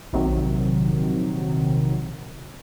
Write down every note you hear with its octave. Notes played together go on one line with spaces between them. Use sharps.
A#1 C3 D#3 F#3